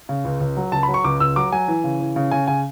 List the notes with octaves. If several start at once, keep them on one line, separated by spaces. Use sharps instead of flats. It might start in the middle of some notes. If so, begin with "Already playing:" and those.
C#3
C#2
C#2
F#3
C#2 A5
B5
F#3
C#6
C#2 D6
C#2 E6
F#3 D6
F#3 G#5
E3
C#3
E3
C#3
C#3 G#5
C#3 G#5